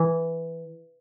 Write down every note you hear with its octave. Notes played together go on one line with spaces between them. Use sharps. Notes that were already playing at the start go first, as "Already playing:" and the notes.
Already playing: E3